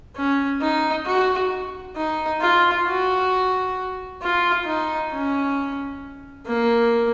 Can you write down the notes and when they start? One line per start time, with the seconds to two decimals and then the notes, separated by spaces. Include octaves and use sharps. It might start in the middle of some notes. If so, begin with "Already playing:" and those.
0.16 C#4
0.61 D#4
1.06 F#4
1.96 D#4
2.41 F4
2.87 F#4
4.22 F4
4.66 D#4
5.12 C#4
6.46 A#3